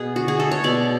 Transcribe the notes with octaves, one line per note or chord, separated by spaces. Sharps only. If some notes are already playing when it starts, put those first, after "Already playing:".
Already playing: B2 B3 G#4
D3 F#4
G#4
A3 A4
C#5
B2 D5